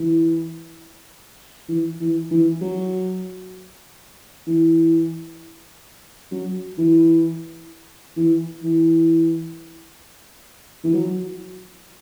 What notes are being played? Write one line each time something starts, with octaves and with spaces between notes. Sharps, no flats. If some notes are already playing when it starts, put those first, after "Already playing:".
Already playing: E3
E3
E3
E3
F#3
E3
F#3
E3
E3
E3
E3
F#3